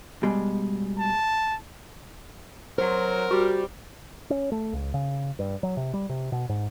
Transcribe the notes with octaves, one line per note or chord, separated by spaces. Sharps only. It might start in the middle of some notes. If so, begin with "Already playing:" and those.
B2 G3 G#3
A5
F#3 A#4 C5
G3 F#4
C#4
A3
C#2
C#3
G2
F#3
C3
G3
C3
B2
G#2